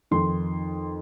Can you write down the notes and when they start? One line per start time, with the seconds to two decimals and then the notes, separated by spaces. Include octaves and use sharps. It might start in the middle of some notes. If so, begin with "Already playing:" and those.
0.11 F2 D#3 C6